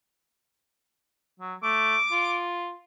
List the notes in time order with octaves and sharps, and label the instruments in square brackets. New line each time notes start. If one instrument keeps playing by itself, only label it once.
[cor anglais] F#3
[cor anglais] A3 [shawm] D6
[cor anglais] F4